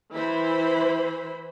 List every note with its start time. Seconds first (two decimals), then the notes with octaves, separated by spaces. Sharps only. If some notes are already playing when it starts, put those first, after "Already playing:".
0.14 E3 E4 C5 B5